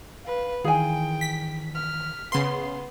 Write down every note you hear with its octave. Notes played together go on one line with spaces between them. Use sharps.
B4 F5
D#3 E3 G#4 F5 G5 G#5
B6
F6
C#3 B3 C6